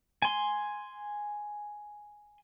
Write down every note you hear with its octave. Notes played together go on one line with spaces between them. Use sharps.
G#5 C6